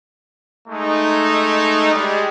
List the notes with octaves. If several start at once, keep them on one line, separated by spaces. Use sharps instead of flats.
G#3 A3 D#4
G3 G#3